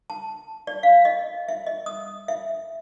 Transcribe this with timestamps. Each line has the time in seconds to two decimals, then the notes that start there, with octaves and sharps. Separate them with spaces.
0.10 A5
0.67 D5
0.83 F5
1.05 D#5
1.48 E5
1.67 D#5
1.86 D#6
2.28 E5